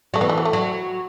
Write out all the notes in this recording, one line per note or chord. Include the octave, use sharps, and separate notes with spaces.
F#3 A3
E3 B3
A3
F#3
A3
F#3